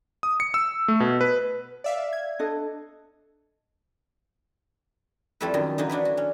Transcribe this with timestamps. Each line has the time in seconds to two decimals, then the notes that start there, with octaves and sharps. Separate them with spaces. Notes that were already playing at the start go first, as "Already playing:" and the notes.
0.23 D#6
0.40 C#7
0.54 E6
0.88 A3
1.00 B2
1.21 B4
1.84 D5 E5 F5
2.13 G#6
2.39 D4 A4 D#5
5.41 F2 G3 A3 E4 A4 B4
5.54 F#2 D#3
5.78 D3 E3 D#4
5.89 F#3 D4 E4 B4
6.05 F#4
6.17 C#4